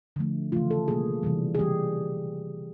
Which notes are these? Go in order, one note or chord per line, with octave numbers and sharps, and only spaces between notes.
D3 F3 A3
C#3 E3 A3 F4
A4
B2 G3 A#3 G#4
C3 E3 G3
G#4
C#3 E3 G3 G4